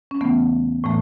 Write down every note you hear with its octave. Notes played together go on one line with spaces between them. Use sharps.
C#4
E2 C#3 E3 A3 B3
A2 E3 A3